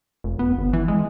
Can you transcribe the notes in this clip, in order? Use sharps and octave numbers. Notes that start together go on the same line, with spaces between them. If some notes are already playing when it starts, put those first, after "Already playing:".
F1
B3
G1
E3
G#3